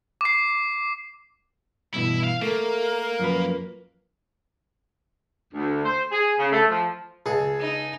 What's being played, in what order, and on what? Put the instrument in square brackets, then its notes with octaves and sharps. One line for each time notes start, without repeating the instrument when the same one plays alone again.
[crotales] D6 C7
[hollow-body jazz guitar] G2 B2 E3 [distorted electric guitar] E4
[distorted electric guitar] F5
[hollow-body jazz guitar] A3 [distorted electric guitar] A#3 [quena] A#4
[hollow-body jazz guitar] F#2 F3 B4
[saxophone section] D2
C5
G#4
C#3
A3
F3
[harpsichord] C#2 A4 [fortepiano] G#4
[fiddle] D#4